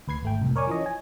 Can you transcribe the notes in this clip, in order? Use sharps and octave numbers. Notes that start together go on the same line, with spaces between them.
D2 B4 G#6 C7
G#1 A3 G5
C2 F2 A2
A#4 C#5 D5 G#5
E3 F3 C#4 C#5 D#5
G#5